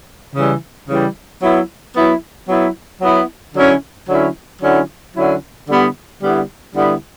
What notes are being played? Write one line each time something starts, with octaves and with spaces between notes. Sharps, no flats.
C#3 E3 G3
C#3 E3 G3
F#3 B3 E4
F#3 B3 E4
F#3 B3 E4
F#3 B3 E4
D3 F#3 C#4 E4
D3 F#3 C#4 E4
D3 F#3 C#4 E4
D3 F#3 C#4 E4
D3 G3 B3 E4
D3 G3 B3 E4
D3 G3 B3 E4